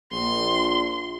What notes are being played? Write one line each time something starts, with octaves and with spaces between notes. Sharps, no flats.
A#1 C6